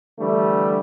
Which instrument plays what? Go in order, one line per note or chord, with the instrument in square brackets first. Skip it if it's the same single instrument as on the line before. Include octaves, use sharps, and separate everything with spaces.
[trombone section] D3 E3 G3 A3